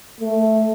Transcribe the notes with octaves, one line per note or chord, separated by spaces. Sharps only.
A3